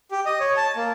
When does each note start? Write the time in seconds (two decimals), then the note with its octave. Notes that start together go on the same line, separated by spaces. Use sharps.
0.11 G4
0.26 D#5
0.40 C#5
0.57 A5
0.76 A#3